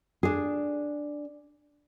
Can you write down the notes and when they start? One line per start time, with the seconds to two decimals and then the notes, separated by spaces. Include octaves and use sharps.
0.23 D4 G#4